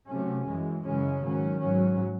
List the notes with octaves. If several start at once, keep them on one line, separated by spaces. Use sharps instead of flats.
C3 F#3 A3 C#4
F#2 E3 G#3
F#2 C#3 E3 G#3 C#4
G#2 D#3 F#3 C#4
G#2 F#3 C#4